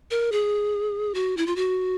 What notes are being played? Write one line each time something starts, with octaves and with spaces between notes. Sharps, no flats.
A#4
G#4
F#4
E4
F4
F#4